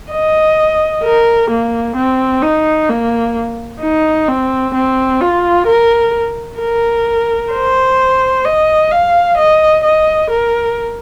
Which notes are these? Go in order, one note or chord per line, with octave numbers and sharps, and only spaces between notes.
D#5
A#4
A#3
C4
D#4
A#3
D#4
C4
C4
F4
A#4
A#4
C5
D#5
F5
D#5
D#5
A#4